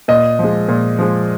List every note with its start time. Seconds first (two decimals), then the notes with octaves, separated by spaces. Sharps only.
0.08 A#2 D#5
0.39 F3 G#3
0.68 A#2
0.99 F3 G#3